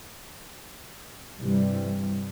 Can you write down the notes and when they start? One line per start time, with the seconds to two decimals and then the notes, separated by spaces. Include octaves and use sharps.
1.39 G2 C3 E3 G3